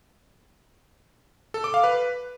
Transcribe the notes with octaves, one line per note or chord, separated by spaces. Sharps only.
A4
D6
F5
B4